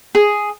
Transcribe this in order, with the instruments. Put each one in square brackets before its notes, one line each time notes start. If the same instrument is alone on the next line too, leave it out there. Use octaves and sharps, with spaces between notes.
[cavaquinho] G#4